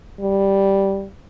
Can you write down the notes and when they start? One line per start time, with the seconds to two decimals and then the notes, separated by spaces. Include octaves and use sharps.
0.21 G3